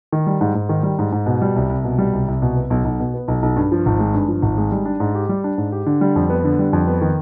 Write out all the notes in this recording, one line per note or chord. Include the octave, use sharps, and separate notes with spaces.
D#3
G3
G#2
G#2
D#3
G3
G#2
G#2
B2
G3
C2
C2
B2
G3
C2
C2
B2
B3
B1
B1
B2
B3
B1
B1
G2
F3
G#1
G#3
G2
F3
G#1
G#3
G3
D4
G#2
G4
G3
D4
G#2
G4
D3
G3
F2
B3
D3
G3
F2
B3
D#3